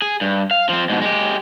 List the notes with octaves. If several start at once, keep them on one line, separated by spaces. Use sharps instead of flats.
G#4
G2
F5
F3 C4
G#2 B2
G#3 G4